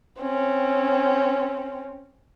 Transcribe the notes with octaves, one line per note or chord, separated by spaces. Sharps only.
C4 C#4